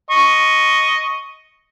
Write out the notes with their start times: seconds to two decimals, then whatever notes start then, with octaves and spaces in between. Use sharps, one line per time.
0.10 D#5 C#6